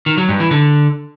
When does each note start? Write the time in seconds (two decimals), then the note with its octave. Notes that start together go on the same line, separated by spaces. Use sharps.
0.06 D#3
0.18 F#3
0.29 G2
0.40 E3
0.51 D3